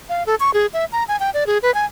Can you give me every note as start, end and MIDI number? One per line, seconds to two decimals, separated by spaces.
0.09 0.23 77
0.26 0.35 69
0.40 0.53 85
0.54 0.67 68
0.73 0.85 76
0.92 1.04 82
1.08 1.19 80
1.20 1.30 79
1.34 1.47 74
1.47 1.58 68
1.63 1.73 71
1.74 1.85 80